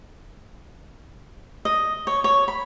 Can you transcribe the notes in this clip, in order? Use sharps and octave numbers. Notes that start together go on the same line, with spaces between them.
D#5
C#5
C#5
B5